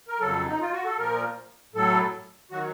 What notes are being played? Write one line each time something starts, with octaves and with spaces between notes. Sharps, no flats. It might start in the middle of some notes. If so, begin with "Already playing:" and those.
A#4
F2 C#3 F#3 A4
D#4
F4
F#4
A4
A#2 F3 A#4
A2 F#3 A4
D#3 F#3 F#4